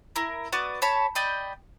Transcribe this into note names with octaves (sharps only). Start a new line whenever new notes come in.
E4 A#4
B3 F#4 D5 D#6
C#5 A5 B5
D5 D#5 G5 B5